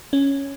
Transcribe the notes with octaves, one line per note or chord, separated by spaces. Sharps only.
C#4